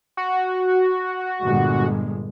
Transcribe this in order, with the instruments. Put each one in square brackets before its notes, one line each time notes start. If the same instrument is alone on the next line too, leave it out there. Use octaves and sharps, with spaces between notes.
[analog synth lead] F#4
[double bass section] G1 A#2 G#3